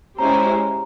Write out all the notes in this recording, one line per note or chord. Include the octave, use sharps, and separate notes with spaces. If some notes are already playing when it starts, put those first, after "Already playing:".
G#3 C#4 E4 G4 C5 A#5